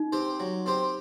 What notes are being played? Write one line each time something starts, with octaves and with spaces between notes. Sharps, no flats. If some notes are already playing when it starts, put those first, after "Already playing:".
Already playing: D#4
C4 G4 C5
F#3
C4 G4 C5